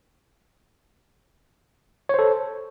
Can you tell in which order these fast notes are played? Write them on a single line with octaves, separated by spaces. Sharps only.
C#5 C5 A4